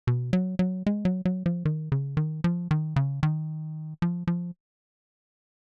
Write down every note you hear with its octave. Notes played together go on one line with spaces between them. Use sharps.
B2
F#3
F#3
G#3
F#3
F#3
F3
D#3
C#3
D#3
F3
D#3
C#3
D#3
F3
F3